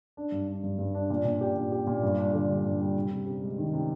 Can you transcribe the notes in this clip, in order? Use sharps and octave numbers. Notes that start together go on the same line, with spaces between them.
D4
G2
D4
G2
G2
D4
A#2
A#2
G4
A#2
G4
A#2
G2
D4
D3
G3
G2
G3
C3
C3
C3
G#3
D#3
C3